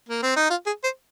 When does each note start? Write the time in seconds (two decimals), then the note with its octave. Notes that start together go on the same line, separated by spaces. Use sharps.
0.09 A#3
0.23 C4
0.36 D#4
0.50 F4
0.66 G#4
0.84 C5